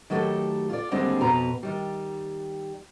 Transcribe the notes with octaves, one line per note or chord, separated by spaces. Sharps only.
D#3 F#3 A3 G4 A4
F4 D5
D#2 D3 G3 G#3 C4 D4
F2 B2 B4 A#5
D#3 G3